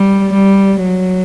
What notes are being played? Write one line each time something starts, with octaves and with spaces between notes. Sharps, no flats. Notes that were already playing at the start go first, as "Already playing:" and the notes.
Already playing: G3
G3
F#3